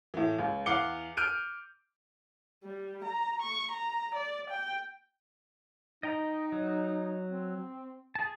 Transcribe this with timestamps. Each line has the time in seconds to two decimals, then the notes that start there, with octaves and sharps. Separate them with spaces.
0.14 A2 E3
0.39 C#2
0.66 E2 F5 F#5 D6 C#7 G7
1.17 F6 G6 D7 D#7
2.64 G3
3.04 A#5
3.42 C#6
3.71 A#5
4.15 D5
4.50 G5
6.03 D#4 D#5 G5 A#5
6.52 F#3
7.28 C4
8.15 G#4 A5